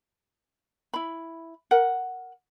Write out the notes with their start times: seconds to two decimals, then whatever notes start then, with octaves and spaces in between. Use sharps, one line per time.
0.94 E4 B5
1.71 A#4 F#5